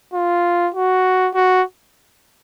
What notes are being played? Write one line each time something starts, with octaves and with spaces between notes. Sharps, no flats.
F4
F#4
F#4